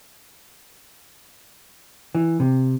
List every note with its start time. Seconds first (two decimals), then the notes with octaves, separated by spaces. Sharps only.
2.15 E3
2.40 C3